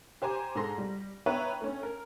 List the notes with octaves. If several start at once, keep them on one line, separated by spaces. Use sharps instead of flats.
G4 C5 G#5 A#5 D6
G#2 G#4 A4 A#5 C6 A#6
G3
B3 B4 C#5 E5 G5 A#5
A3 C#4
A#4